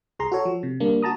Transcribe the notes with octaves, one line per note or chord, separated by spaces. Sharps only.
C2 G#4 A#5 C6
F#4 A4 C#5
F3
C3
D3 G3 A#3 D4
F#4 A5 A#5 D#6